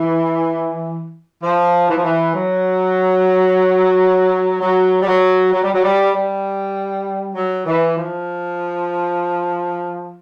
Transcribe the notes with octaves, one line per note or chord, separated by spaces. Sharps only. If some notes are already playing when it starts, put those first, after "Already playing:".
Already playing: E3
F3
E3
F3
E3
F#3
F#3
G3
F#3
F#3
G3
F#3
G3
G3
F#3
E3
F3